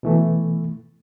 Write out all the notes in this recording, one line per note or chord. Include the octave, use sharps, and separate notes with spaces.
B2 E3 A3